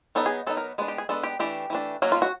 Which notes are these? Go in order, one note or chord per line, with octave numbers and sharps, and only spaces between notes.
F#3 B3 D#4 A4
G#4
F#3 B3 D#4 A4
A#4
G#3 B3 D4
G4
G#4
G#3 B3 D4 A4
G4
E3 A3 D4 G4
E3 A3 D4
F#3 A#3 C#4 F#4
F4
F#4